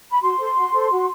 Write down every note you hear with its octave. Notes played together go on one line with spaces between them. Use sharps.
B5
F#4 C6
A4 C5
F#4
A4 C5
F#4